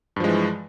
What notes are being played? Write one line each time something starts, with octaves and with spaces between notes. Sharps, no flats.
G2 E3 F3 G#3